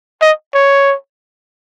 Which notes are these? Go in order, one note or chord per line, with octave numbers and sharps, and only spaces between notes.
D#5
C#5